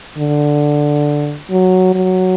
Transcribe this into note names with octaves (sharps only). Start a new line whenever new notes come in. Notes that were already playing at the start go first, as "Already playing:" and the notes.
D3
F#3
F#3